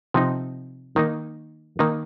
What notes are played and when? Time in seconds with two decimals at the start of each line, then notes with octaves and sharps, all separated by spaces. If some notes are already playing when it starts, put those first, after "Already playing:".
0.14 C3 F3 C4 D#4
0.96 D#3 A#3 D#4
1.79 D#3 A#3 D#4